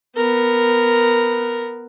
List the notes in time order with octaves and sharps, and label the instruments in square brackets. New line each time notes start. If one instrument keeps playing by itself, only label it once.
[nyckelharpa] B3 A#4